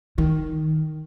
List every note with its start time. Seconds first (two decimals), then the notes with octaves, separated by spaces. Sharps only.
0.18 D#3